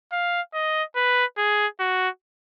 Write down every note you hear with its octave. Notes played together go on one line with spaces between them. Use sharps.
F5
D#5
B4
G#4
F#4